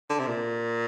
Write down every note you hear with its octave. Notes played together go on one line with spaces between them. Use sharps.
D3
C3
A#2